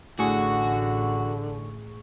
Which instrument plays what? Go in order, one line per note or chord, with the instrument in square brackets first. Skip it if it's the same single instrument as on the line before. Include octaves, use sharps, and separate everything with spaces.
[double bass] A1 [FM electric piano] A2 G#4 C#6 [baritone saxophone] D3 [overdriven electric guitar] F#4